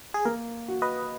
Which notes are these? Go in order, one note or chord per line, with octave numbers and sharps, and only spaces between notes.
G#4
A#3 A#4
F#4
B4 D#5